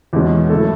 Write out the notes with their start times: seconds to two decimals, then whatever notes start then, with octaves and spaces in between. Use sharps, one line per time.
0.13 E2 B2 G#3 C#4
0.50 F#3 A3 E4 A4